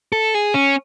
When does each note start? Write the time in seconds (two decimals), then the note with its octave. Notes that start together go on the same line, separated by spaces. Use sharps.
0.12 A4
0.34 G#4
0.54 C#4